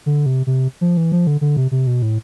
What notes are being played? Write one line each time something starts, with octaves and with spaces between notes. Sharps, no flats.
D3
C3
C3
F3
E3
F3
D3
D3
C3
C3
B2
A2